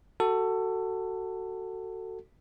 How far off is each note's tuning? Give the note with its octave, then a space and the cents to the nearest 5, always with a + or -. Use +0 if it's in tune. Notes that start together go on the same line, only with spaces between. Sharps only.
F#4 +15 A4 +20